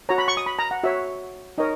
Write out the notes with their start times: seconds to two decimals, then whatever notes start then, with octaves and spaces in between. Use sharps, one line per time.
0.09 F#4 C#5 A#5
0.18 B5
0.28 C#6
0.37 D#6
0.46 B5
0.59 A#5
0.71 F#5
0.83 F#4 C#5 E5
1.58 D#4 A#4 C#5 D#5